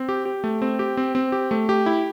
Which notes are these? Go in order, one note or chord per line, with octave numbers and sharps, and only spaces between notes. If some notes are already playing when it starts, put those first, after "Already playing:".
Already playing: C4
G4
G4
A3
C4
G4
C4
C4
G4
A3
G4
E4